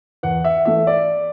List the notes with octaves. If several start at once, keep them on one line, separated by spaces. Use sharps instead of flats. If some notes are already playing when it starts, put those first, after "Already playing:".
E2 F#5
E5
E3 A3 E5
D5